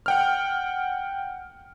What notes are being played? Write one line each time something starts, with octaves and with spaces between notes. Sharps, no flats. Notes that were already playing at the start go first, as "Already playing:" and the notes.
F#5 G5 F6